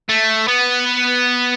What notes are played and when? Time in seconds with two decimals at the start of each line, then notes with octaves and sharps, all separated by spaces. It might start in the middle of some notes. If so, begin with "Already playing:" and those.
0.09 A3
0.48 B3